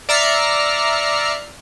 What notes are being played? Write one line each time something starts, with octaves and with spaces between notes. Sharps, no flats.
D5 E5 A#5 F6 C7 C#7